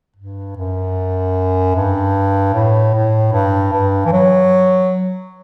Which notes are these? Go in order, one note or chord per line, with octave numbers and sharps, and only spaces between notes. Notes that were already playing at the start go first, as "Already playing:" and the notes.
G2
F#2
G2
A2
A2
G2
G2
E3
F#3